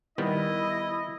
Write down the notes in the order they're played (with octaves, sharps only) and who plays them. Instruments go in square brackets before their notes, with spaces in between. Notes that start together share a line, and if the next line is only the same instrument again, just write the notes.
[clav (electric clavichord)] D#3 G3 B3 [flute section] E4 [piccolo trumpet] D#5